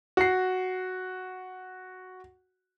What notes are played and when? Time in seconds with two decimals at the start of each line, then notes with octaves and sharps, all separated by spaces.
0.17 F#4 C7